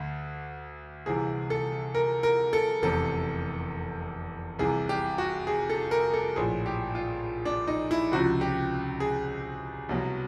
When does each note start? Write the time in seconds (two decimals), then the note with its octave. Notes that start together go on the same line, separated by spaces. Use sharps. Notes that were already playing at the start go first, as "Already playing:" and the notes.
Already playing: D2 D3
1.06 C2 C3 E3 G#4
1.50 A4
1.95 A#4
2.23 A#4
2.53 A4
2.82 F1 E2 C3 A4
4.59 C2 C3 E3 G#4
4.89 G4
5.18 F#4
5.47 G#4
5.70 A4
5.91 A#4
6.14 A4
6.36 A#1 A2 F3 G#4
6.66 G4
6.95 F4
7.45 D4
7.67 D#4
7.91 E4
8.12 C#2 C3 F3 F#4
8.41 G4
9.00 G#4
9.89 C2 B2 F#3